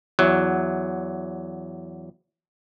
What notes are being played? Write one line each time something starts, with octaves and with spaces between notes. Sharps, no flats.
E2 F#3